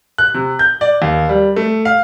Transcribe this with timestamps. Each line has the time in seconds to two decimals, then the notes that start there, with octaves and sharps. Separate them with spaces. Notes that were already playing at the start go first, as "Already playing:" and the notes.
0.18 F#6
0.34 C3
0.59 G6
0.81 D5
1.02 D#2
1.29 G3
1.56 A3
1.85 F5